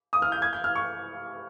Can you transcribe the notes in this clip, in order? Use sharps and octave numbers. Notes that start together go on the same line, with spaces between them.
D#6
F6
G6
G#6
G6
F6
C#6